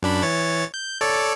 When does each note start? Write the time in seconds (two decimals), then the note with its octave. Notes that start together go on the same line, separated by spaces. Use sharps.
0.03 F#2 D4 B5
0.22 E3 C#5 A6
0.74 G6
1.01 A4 C#5 D5